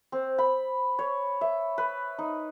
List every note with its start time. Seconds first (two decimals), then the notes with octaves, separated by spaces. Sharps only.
0.12 C4
0.38 B5
0.99 C#5
1.41 E5
1.78 B4
2.19 D#4